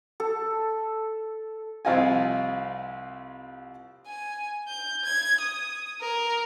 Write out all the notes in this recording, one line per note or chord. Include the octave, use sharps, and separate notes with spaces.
A4
C2 F3 C4 F4 D#5 G#5
G#5
G6
G#6
D#6
A#4